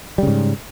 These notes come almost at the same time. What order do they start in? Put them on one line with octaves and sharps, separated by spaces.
G3 C#3 G#2